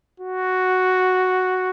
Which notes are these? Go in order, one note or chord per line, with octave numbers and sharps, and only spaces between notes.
F#4